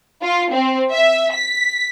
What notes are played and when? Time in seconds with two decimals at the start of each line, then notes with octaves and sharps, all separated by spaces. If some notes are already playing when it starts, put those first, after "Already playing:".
0.22 F4
0.52 C4
0.91 E5
1.34 B6